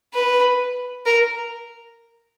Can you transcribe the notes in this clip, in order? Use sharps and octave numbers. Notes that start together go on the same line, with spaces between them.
B4
A#4